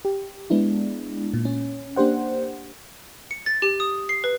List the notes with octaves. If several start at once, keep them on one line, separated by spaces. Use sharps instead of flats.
G4
G#3 B3 D4 E4
A#2
C#4
A#3 D4 G4 C5 F#5
C#7
A6
G4
D#6
C7
B4